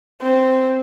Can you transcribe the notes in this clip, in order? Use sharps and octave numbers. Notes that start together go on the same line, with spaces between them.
C4